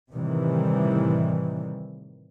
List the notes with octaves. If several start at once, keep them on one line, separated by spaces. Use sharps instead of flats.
A2 C3 D#3 E3 G3